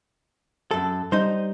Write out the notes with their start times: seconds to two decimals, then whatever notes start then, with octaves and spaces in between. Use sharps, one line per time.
0.71 F#2 A4
1.12 G3 D#4 C5